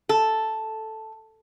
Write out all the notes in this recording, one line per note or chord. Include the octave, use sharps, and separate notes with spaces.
A4